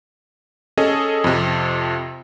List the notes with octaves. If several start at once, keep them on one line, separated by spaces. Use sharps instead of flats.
C#4 G#4 A4 D#5
F2 C3